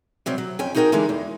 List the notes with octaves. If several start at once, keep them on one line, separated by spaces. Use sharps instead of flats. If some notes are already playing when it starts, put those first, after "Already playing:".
C3 F#3 G3 C4
F#3
F2 C#4 G5 G#5
D#4 F#4 G#4 A#4 D#5 G5
D3 E3 G#3 D#4 A#4
E2